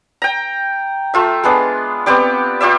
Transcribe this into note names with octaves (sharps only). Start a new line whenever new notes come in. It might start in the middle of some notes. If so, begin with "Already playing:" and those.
G5 A#5
A3 F4 E5
G#3 B3 D4
B3 C4 G4 D5
F4 G4 D5 E5